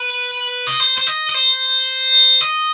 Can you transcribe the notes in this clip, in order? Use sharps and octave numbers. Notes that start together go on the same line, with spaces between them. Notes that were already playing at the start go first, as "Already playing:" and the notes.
Already playing: B4
D#5
C5
C5
D#5
D#5
C5
D#5